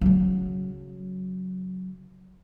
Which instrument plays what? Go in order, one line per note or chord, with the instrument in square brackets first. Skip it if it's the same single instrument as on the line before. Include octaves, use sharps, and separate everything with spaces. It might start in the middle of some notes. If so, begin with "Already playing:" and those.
[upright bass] C#3 F#3